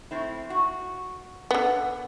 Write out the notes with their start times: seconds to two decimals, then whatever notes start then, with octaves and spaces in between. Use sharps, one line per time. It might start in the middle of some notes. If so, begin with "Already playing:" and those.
0.11 A2 C4 E4
0.50 F#4
1.51 D3 B3